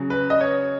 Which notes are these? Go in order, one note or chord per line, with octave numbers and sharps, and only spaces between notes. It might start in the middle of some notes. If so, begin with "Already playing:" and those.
Already playing: C#3 F#3
B4
D#5
C#5